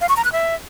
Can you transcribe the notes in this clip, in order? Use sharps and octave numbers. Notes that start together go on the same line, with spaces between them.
F5
C#6
A#5
F#6
E5